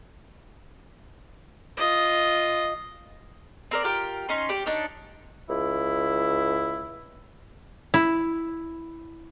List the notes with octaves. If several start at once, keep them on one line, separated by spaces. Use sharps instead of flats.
F4 D#5
C4 A#4 D5
F4 G4 A#4 G5
C#4 D#4 C6
G4 D5
D4 D#4 C#5
C#2 E4
E4